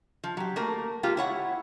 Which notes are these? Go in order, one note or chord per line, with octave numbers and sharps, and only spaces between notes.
F3
F#3 G4
A3 A#3 A#4
G#3 A#3 F4 G4
E4 C#5 F#5